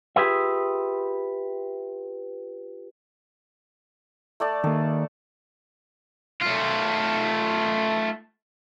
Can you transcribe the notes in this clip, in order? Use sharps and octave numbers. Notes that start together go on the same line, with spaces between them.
F4 G4 G#4 B4 E5
A3 D5 A5
D#3 A#3 A4
A3 F4